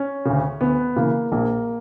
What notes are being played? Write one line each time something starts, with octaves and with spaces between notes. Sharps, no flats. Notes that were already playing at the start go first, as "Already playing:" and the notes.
Already playing: C#4
D2 C#3
D2 B3
C#3 E3 A#3
A#1 A#3